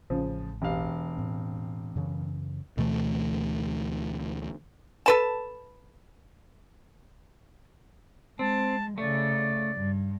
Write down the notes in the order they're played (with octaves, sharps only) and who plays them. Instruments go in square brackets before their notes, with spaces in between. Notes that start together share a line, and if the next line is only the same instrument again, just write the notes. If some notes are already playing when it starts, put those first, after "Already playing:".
[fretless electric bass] A1 [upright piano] C#3 F3
[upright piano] E1 G4 F5
[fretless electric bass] A2 C4
F#2 C#3 E3
[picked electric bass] D2 B2 E3 A3
[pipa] A4 B4 A5
[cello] G#3 [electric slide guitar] C4 [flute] A5
[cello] C#3 [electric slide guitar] A3 [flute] D5
[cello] G2